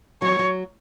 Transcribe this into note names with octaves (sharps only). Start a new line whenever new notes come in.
F#3 C#5
F#3